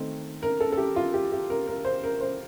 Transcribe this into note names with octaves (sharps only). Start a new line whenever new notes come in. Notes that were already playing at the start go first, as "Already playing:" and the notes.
Already playing: D#3 A3 C4
A#4
A4
A4
G4
F4
G4
G4
A#4
A#4
C5
A#4
C5